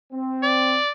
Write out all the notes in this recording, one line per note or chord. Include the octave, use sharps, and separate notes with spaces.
C4
D5